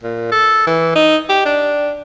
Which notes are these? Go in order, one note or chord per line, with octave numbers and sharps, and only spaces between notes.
A#2
A4
E3
D#4
G4
D4